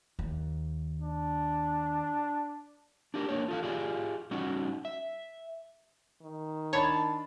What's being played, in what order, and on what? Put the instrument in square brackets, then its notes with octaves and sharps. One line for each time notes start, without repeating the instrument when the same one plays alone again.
[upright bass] D#2
[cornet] D4
[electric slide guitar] D4 G4 A#4
A#3 D4 C#5
F4 A4 F5
F4 G4 G#4 D5 F5
G3 C#4 D#4 F#4
E5
[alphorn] D#3
[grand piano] D4 B5 [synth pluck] C#5 [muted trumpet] A5